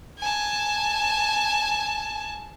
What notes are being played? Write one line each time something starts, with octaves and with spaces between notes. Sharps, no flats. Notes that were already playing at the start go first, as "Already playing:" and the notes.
G#5 A5